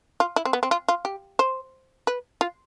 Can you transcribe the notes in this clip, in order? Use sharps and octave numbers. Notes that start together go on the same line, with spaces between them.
F4
E4
C4
B3
C4
F4
F4
G4
C5
B4
F4